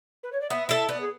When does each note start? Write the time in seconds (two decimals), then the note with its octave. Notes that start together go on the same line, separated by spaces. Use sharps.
0.23 B4
0.32 C#5
0.40 D5
0.50 B3 E5
0.69 E4 A4 E5
0.89 B3 D5
1.00 G#4